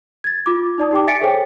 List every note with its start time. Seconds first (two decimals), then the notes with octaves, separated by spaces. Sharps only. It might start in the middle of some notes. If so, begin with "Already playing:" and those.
0.24 G#6 A6
0.46 F4 D6
0.78 D#4 D5 A5 D#6
0.91 D#4 G4 G5 D6
1.07 E5 G#5 A6 B6 C#7 D7
1.21 G#4 A4 C5 C#5 G5